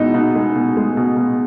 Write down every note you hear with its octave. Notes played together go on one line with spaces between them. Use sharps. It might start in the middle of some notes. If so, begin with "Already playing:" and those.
Already playing: B2 G#3 B3 D#4 E4
B2 D#4
G#3
B2
G#3
B2
B2